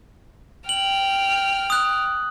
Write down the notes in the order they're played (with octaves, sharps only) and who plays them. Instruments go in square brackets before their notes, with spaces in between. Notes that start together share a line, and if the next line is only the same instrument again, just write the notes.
[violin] G5 F6 [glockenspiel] F#7
[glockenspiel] D#6 F#6